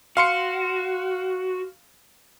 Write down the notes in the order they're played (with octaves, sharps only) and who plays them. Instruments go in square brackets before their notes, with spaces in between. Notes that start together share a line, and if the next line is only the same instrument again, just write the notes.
[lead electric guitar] F#4 [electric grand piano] F5 C6 C#7